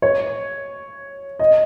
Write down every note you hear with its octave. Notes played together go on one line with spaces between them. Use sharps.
C#5
D#5